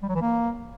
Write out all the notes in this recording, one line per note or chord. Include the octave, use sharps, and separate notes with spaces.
G3
F#3
E3
A#3